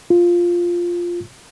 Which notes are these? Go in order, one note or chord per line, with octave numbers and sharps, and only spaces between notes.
F4